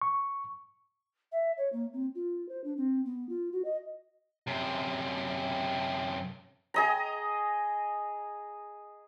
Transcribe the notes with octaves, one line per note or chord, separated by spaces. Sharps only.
C#6
E5
C#5
A#3
C4
F4
C5
D4
C4
B3
F4
F#4
D#5
F#2 C3
G#4 D#5 A#5